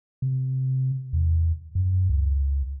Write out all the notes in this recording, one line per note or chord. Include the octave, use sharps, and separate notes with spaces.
C3
E2
F#2
C#2